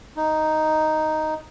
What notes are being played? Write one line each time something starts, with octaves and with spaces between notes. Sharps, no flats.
D#4